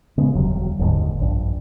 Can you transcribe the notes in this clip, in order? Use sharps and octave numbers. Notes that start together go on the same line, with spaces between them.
C#3 G#3 B3
E1 D2 F#3 G3
F#1 D#2 G#2 D3
A#1 G2